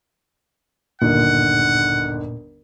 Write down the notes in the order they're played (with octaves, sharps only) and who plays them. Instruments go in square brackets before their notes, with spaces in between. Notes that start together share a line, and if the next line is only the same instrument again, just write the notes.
[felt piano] G1 D#2 [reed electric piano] A#2 [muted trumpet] F#5